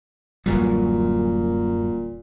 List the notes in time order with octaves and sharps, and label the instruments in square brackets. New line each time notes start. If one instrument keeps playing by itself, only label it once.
[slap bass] D1 E3 G3 [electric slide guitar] F#2 [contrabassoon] A#2